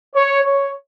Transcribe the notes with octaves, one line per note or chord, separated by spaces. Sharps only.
C#5
C#5